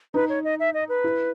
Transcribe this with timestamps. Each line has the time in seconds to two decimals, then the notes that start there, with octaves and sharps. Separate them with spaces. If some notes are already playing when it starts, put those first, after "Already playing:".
0.14 D#4 B4
0.29 C#5
0.44 D#5
0.60 E5
0.74 D#5
0.89 B4
1.04 E4